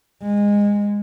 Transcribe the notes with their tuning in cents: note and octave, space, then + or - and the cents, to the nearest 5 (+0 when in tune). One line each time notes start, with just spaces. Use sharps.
G#3 -20